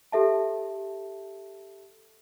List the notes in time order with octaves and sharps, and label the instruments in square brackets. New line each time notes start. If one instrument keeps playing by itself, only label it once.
[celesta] G4 A4 E5 A5